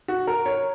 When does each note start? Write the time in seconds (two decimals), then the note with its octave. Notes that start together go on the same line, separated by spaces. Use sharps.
0.08 F#4
0.27 A#4
0.46 C#5